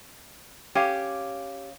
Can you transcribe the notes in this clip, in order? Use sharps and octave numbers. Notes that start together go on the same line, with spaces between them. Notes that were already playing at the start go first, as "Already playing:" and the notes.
C#4 G4 F5